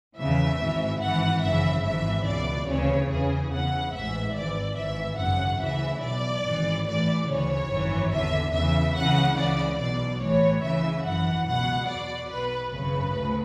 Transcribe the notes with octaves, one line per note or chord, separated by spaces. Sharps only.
E2 C#3 E3 E5
G#1 G#2 E3
G#1 G#2 E3 F#5
G#1 F#2 C#3 E3 E5
G#1 G#2 E3 E5
C#2 B2 D5
D2 C#3 E3 C#5
E2 C#3 E3 G#4
E2 C#3 E3 F#5
A1 G#2 E3 E5
G#1 G#2 E3 D5
G#1 G#2 E3 E5
G#1 F#2 C#3 F#5
D2 C#3 E3 E5
B1 B2 D5
G#1 G#2 E3
A1 A2 E3 D5
D2 C#3 E3 C#5
G#1 F#2 E3
E2 D3 E5
E2 C#3 E3 E5
C#2 C#3 E3 F#5
C#2 C#3 E3 D5
B1 B2 D5
A1 A2 E3 C#5
C#2 C#3 E3 E5
G#1 F#2 E3 F#5
C#2 B2 F#5
E2 B2 D5
B1 B2 B4
G#1 F#2 C#3 B4
D2